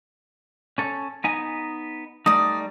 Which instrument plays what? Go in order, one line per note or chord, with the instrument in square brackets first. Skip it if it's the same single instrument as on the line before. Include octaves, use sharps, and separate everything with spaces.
[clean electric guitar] C#4 A4
B3 D#4 G#5
[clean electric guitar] G3 A3 D#4 [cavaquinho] D5 D#6